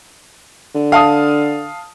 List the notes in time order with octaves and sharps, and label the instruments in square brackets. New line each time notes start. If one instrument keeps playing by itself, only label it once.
[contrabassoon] D3
[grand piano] F5 A5 D#6